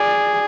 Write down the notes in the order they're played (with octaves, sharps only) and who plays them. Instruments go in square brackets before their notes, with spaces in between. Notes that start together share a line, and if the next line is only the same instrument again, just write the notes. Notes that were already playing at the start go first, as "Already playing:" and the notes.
Already playing: [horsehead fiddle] G#4 [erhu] D5